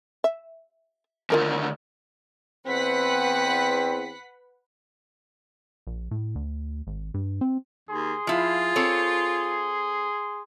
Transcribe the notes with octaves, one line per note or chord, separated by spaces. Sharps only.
E5
D#2 D3 F4 A#4 A5
E2 C4 B4 F#5 B6
A#1
A2
D2
G#1
G2
C4
D#2 G#4 C6
F3 E4 F4
C4 A4 C#5